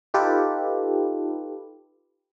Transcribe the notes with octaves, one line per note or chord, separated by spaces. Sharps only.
D#4 F4 G4 A4 B4